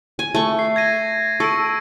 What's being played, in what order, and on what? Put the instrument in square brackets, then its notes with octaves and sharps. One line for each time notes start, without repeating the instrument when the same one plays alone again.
[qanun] G#5
A3 C#6
[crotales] C7
G#6 A#6 D#7
[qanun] A4 [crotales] C#6 E6 D7